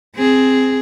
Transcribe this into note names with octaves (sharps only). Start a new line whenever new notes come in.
C4 G#4